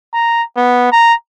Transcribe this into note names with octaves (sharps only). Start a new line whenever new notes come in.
A#5
B3
A#5